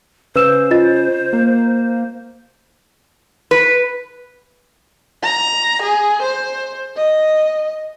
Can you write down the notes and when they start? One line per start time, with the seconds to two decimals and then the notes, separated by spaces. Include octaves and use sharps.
0.36 C#3 B4 C5 E6 E7
0.71 F4 D#5 A6
1.33 A#3
3.51 B4
5.23 A#5
5.83 G#4
6.22 C5
6.96 D#5